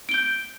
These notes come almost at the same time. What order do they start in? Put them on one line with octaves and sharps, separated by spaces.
D7 G7 G6